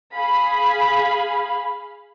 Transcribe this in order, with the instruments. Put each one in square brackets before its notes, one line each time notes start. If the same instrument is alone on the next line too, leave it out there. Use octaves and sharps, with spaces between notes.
[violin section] G#4 F5 B5